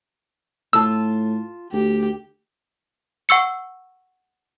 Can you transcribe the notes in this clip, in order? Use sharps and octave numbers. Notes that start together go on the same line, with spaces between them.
A2 F4 A5 E6
D2 G4
F#5 C#6 E6 C#7